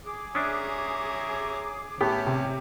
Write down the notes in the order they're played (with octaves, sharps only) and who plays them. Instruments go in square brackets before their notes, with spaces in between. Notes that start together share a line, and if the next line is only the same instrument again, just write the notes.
[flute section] G#4 D6
[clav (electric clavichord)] C#4 D4 [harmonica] C#5 E5 A#5 [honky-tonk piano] D#6
[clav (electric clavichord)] A2 B3 [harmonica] C#4 E4 [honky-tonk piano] G4
[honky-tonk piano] C3